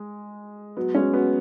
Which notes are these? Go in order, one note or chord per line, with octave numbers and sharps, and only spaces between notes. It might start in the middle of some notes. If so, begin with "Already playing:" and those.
Already playing: G#3
F#3 B3
G#3 C#4
F#3 B3